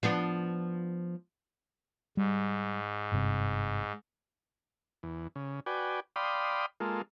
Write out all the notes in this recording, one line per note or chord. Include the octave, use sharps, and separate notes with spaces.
F3 B3 D4
G#2 G3
G1 G2 C3
E2
C#3
F#4 B4 D5 G5 G#5
D5 F5 G5 B5 C6 D#6
G#3 A#3 F4 A4